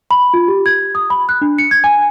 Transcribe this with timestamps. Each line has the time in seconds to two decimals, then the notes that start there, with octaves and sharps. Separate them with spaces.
0.11 B5
0.34 F4
0.48 G4
0.66 G#6
0.95 D#6
1.10 B5
1.29 F#6
1.41 D4
1.58 C#7
1.71 G#6
1.84 G#5